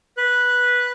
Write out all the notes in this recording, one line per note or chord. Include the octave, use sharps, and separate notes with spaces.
B4 F#6